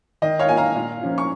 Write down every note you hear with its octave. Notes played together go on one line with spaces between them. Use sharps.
D#3 D#5
C#5 F5
A#3 F4 G#5
F5 A#5
A#2
F3 C#4 F4
C#6